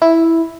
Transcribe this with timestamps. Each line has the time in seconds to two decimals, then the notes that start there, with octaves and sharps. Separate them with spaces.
0.02 E4